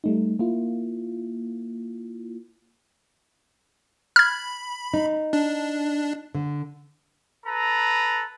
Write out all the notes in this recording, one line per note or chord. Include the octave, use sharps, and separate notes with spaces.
G3 A3 D#4
A#3 E4 F4
B5 F6 G#6
D#4
D4
D3
A4 B4 A#5